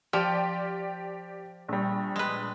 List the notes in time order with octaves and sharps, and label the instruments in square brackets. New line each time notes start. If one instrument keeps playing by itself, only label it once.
[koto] F3 [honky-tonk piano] G4 D5 G5
[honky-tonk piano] A#1 G3
[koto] G#3 B4